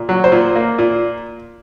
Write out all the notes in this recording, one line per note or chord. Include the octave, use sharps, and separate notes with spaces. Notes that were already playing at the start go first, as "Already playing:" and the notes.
Already playing: A#2
F#3
C5
A#2
A#3
A#2